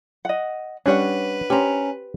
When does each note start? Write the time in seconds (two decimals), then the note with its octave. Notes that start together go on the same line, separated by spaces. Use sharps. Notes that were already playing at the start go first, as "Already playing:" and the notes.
0.25 D#5 F#5
0.86 G3 C#4 D4 B4 C#5 F#5
1.50 C#4 G4 C5 A#5